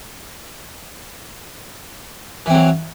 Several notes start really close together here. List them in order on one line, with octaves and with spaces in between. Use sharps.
E3 C4 F#3